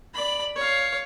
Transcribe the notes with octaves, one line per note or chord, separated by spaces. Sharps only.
D5 B5
C#5 F5